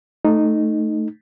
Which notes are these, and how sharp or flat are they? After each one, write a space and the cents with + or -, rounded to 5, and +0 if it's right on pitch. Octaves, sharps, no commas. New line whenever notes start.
A3 +0 D#4 -10